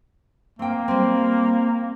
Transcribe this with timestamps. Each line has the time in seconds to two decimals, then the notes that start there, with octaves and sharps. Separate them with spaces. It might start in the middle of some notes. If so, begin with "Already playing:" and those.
0.59 A#3 C4 G5
0.88 G3 C4